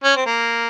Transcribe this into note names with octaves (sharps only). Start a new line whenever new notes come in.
C#4
C4
A#3